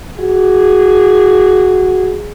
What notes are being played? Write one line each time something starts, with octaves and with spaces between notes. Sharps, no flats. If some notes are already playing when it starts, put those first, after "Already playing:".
F#4 G#4